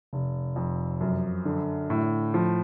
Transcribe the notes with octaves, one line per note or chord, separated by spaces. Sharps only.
F1
F2
F#2
D3
A2
F3